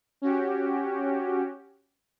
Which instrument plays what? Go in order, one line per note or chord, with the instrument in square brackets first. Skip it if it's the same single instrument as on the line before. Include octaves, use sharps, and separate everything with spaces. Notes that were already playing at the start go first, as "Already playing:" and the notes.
[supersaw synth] C#4 F#4 G4